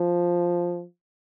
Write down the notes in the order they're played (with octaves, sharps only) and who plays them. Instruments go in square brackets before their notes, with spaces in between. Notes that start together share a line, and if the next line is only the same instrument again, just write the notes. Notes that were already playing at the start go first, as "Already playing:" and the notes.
Already playing: [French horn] F3